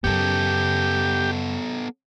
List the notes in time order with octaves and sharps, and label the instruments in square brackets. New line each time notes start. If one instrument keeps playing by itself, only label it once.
[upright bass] F#2 C#3 [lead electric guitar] B3 A4 [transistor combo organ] G4